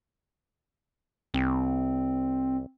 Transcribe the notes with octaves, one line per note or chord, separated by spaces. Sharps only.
C2 C4